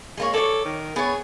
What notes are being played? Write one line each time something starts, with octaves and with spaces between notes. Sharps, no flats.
G#3 A#3 C#5
A4 C#5 D5
D#3
B3 G#4 C#5